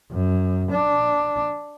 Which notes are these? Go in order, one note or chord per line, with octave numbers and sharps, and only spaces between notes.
F#2
D4